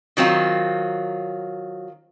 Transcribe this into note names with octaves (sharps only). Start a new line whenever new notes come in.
D#3 F#3 C4 F4